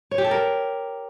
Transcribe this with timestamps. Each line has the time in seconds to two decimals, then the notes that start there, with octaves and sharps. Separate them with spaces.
0.11 C#5
0.18 G4
0.25 A4
0.31 A#4